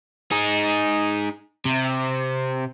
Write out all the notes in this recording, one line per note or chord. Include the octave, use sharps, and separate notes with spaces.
D#4 G#4
C3